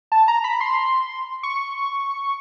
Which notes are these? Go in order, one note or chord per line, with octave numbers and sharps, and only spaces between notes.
A5
A#5
B5
C6
C#6